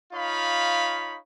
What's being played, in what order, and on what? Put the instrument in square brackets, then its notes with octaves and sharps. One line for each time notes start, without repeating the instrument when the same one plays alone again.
[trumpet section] D#4 F4 C#5 F5 B5